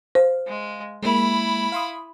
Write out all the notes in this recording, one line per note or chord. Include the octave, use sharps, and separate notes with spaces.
C5 F5
G#3
G#3 A#3 E4 B5
F5 C6 D#6